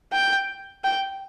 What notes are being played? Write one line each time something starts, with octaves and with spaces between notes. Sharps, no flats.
G5
G5